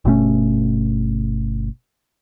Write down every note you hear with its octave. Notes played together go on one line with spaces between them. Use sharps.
G1 B2 A3 C#4